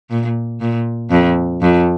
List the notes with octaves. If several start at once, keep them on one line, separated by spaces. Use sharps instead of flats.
A#2
A#2
F2
F2